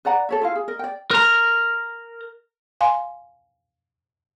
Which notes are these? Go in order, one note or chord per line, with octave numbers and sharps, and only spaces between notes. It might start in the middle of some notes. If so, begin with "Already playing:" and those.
B4 D5 F#5 A#5
A4 C#5 E5
E4 F4 F5
G#4
A#4 D#5
D5 G5
A#4 A#5
F5 G#5 C6